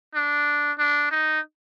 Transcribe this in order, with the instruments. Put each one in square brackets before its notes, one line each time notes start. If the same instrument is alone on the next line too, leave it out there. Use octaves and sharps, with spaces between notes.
[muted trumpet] D4
D4
D#4